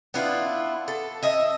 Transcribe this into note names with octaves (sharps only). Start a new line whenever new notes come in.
B3 D4 E4 F4
A4
D#5 E5